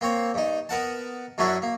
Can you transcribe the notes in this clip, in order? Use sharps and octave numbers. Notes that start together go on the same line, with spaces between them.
A#3 C4 C#5
G2 D#4
B3 A#4 F#5 A5
F#2 F#3 C#4 D4 E4 F#4
A#3